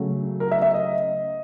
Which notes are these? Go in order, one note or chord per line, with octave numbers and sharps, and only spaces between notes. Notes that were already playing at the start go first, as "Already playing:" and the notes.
Already playing: C#3 F#3 A3
A#4
E5
E5
D#5